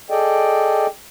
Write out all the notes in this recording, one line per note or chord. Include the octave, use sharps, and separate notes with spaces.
G#4 A4 D5 D#5 G5